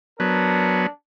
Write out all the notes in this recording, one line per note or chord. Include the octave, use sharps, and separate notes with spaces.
F#3 B3 D4 A#4 A5